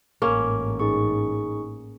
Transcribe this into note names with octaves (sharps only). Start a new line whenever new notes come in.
A1 G#2 A#3 C#4
D#4 G#4 C#6